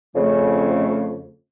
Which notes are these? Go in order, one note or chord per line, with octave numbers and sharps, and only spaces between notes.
F2 C#3 A3